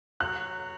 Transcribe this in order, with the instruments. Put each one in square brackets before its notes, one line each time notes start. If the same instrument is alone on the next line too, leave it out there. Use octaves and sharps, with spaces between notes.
[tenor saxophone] F#3 [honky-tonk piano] F#6